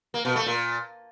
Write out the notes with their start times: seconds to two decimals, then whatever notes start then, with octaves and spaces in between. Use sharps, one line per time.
0.14 A#3
0.25 B2
0.36 A3
0.46 A#2